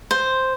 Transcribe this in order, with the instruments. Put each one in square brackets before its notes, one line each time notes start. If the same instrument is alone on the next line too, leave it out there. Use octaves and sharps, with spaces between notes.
[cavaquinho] C5